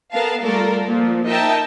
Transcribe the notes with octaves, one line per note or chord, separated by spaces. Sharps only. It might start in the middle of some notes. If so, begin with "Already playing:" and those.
B3 A4 A#4 F5 A5
G3 A3 F4 A4 A#4 D5
A#2 F3
D#4 A#4 D#5 E5 G5 A5